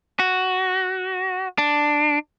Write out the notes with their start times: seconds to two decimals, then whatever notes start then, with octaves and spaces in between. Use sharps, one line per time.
0.19 F#4
1.58 D4